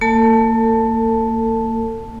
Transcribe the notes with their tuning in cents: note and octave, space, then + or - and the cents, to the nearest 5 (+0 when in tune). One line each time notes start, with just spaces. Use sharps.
A#3 -30 A4 +35 A5 +0